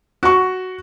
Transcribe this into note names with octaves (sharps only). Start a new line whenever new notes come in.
F#4 C#6